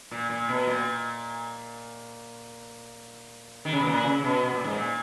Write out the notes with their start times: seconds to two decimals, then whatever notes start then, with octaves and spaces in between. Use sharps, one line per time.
0.11 A#2
0.30 A#2
0.49 B2
0.67 A#2
3.65 D#3
3.72 C#3
3.80 B2
3.87 A#2
4.05 C#3
4.24 B2
4.43 B2
4.54 A#2
4.64 G#2
4.75 A#2